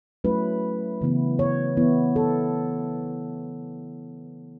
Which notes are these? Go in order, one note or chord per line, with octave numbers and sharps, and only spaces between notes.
F#3 A3 C#4 E4 B4
C#3 E3 B3 E4
C#5
E3 B3 E4
A4